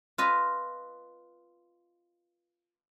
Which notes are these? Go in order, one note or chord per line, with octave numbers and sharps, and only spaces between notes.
F4 B4 D#5